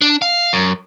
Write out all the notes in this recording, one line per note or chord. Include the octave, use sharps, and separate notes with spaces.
D4
F5
F#2